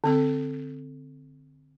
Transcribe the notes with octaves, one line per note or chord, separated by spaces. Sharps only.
D3 C4 A4